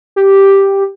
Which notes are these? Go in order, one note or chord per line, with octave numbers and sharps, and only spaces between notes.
G4